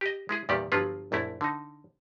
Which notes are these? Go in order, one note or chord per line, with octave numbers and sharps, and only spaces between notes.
G4 D#5
G#3 E4 G#4
E2 A#2 D#3 G3 G4 D5
G1 F3 F#3 F4 B4
A#1 F#2 A3 E4
D3 D#4